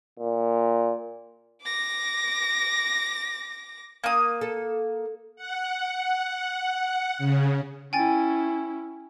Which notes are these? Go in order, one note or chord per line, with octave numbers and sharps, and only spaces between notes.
A#2
D6 A#6
A#3 D#6
A4
F#5
C#3
C#4 E4 G5 G#5 A6